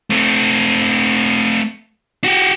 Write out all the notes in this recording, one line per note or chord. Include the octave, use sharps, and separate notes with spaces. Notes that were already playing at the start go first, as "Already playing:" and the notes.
A3 C4
F#4 G4